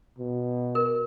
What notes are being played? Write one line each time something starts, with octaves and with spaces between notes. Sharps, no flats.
B2
A#4